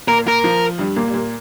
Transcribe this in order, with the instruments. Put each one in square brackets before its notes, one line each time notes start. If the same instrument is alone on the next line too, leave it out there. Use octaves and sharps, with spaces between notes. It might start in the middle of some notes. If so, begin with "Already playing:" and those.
[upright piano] A#2 A#3 [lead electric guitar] A#4
[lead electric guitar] A#4
[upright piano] F3
G2 G3
A#2 A#3
G3
A#2 A#3